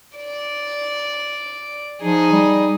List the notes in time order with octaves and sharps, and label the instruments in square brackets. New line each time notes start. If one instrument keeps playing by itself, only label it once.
[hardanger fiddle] D5
[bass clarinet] F3 [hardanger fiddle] D#4 G#4
[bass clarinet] G3